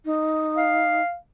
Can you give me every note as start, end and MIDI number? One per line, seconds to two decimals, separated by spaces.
0.05 1.01 63
0.57 1.17 77